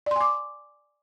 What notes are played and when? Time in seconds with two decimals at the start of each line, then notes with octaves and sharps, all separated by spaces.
0.06 D5
0.11 C6
0.16 G#5
0.21 D6